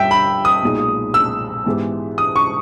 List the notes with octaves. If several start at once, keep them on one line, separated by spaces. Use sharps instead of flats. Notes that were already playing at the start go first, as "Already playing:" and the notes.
Already playing: G2 G3 C#4 G4 E5 G5
B5
D#6
B1 A#2 G#3 D#4 G#4
E6
G#2 E3 G#3 B3 G4
D#6
C#6